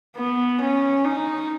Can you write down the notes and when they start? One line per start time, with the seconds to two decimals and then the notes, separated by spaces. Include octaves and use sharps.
0.17 B3
0.61 C#4
1.04 D#4